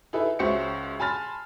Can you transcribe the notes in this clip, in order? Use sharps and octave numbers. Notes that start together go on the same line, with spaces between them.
D#4 E4 G#4 A4 B4
C#2 C#4 F#4 C5 E5 C#7
G#5 A5 B5 C6 F6 A6